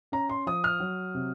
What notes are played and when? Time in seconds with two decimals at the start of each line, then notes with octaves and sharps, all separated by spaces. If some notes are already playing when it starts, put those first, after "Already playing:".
0.12 C#4 A#5
0.29 C6
0.46 F3 D#6
0.64 F6
0.80 F#3
1.14 C3